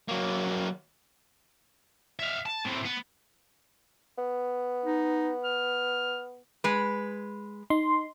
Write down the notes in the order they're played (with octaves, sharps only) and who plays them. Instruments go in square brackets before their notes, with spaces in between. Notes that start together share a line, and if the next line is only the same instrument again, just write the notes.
[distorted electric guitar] F#3 A#3
E5 F5
A5
A2 C3
B3
[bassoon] B3
[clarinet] D#4
F6
[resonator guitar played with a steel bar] G#3 B4
[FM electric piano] D#4 C6